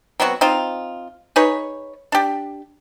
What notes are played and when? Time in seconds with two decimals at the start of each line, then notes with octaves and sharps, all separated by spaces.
0.20 F#3 B3 C4 F#4
0.41 C4 D#4 F4
1.36 D#4 G#4 B4 C#5
2.12 D4 G4